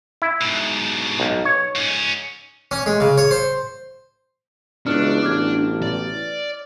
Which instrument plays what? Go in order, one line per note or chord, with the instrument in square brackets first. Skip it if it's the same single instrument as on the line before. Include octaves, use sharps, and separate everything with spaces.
[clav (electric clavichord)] E4
[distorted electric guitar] G#2 B2
[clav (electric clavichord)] B1
C#5
[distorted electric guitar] G#2 C#4
[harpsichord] C#4
G#3
C#3
C#5
C5
[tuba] C#2 [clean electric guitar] B2 E3 [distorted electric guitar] D4 [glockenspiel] F6
[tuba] A1 [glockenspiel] D6 F6 G#6
[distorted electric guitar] D5